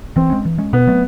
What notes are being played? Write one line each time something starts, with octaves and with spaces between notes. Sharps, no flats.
E3 C4
G#3 C#4
E3
G#3 C#4
B2 B3
F#3 A3 C4